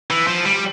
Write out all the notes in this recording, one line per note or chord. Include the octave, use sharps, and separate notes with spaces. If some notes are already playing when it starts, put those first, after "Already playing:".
E3
F3
G3